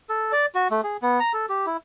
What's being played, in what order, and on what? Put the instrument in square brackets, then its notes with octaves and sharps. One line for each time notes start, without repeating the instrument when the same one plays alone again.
[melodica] A4
D5
F#4
A3
G#4
B3
A#5
A4
G4
E4